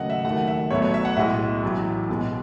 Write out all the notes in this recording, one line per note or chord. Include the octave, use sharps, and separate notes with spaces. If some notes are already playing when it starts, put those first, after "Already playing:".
Already playing: D#2 C#3 F#3 A3 D#5 F#5
E5
D#2 D#3 F#3 A3 F#5
E5
B1 B2 F#3 A3 C#5
C#5
E5
F#5
B1 A2 G#3 E5
A1 A2 F#3
B1 B2 G#3